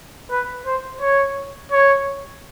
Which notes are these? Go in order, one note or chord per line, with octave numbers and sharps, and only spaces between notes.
B4
C5
C#5
C#5